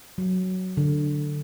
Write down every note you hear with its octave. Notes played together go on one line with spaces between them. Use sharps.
F#3
D3